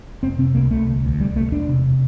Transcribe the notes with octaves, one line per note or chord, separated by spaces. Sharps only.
F1 C4
C3 C4
C2 A#3
C2 A3
D2
D2
C2 G3
C2 A3
E1 D4
C3